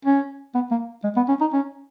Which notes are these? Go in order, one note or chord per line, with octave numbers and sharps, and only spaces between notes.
C#4
B3
A#3
G#3
B3
C#4
D#4
C#4